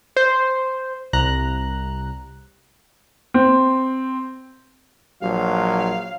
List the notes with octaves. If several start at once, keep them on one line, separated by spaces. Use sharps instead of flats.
C5
C2 A#5 F#6
C4
A#1 F#3 F5